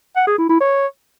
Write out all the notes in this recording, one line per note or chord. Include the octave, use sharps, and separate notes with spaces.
F#5
G#4
E4
E4
C#5